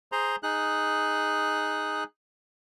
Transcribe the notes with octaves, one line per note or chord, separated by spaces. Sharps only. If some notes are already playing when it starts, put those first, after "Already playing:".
G#4 C5 A#5 C6
D#4 G#4 F#6